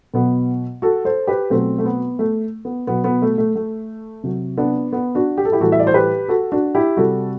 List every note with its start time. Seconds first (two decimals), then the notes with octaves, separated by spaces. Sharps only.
0.14 B2 F#3 B3
0.82 F#4 A4
1.05 A4 C5
1.27 G4 B4
1.50 B2 F#3 A3 C4
1.78 A3
1.85 B3
2.19 A3
2.65 B3
2.87 B2 F#3 B3
3.04 B3
3.22 A3
3.38 A3
3.55 A3
4.24 C3 F#3
4.58 B3 D4
4.93 B3
5.15 D4 F#4
5.38 G4
5.45 A4
5.52 E4 G4
5.60 A2 E3 G3 F#4 A4
5.72 E5
5.80 D5
5.87 C5
5.94 G4 B4
6.29 F#4 A4
6.52 D4 F#4
6.75 E4 G4
6.97 C3 G3 F#4 A4